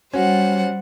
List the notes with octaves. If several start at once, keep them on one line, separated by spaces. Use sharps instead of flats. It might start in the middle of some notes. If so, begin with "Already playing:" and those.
G3 C#4 F#4 C5 F#5